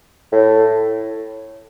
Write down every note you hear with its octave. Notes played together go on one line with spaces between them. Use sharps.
A2